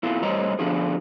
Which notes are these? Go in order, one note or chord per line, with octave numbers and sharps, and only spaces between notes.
B3 E4 F4
A2 G3 C5 C#5 D#5 A#5
D3 F3 B3 D4 F4 G#4